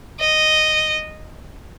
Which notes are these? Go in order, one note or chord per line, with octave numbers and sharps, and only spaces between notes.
D#5